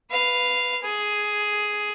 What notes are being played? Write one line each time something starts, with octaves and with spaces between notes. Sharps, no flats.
B4 F5
G#4